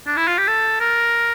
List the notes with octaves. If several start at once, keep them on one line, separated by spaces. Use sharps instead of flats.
D4
E4
F4
G4
A4
A#4